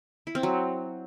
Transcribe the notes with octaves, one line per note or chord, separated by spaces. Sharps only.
E4
C4
F#3